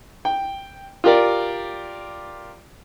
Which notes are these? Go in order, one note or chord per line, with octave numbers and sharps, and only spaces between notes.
G5
F4 G4 A#4 D5